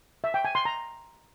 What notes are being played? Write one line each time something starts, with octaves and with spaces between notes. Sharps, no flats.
E5
G5
G#5
C6
A#5